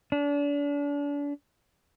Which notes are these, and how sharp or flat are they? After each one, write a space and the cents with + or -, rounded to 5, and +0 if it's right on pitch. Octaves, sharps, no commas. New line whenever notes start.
D4 -35